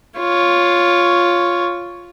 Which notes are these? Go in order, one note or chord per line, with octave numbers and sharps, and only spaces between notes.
F4 C#5